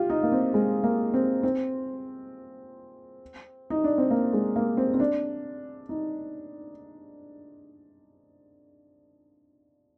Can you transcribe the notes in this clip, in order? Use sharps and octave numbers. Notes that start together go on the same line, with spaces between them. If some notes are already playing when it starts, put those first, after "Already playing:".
Already playing: F4 G4
D#4
A#3
C4
G#3
A#3
C4
C4
D#4
D4
C4
A#3
G#3
A#3
C4
C4
D4
D#4